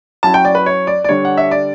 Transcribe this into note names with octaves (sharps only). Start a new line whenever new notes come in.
F#3 C#4 E4 A5
G5
D5
B4
C#5
D5
D5
D3 G3 D4 C#5
F#5
E5
D5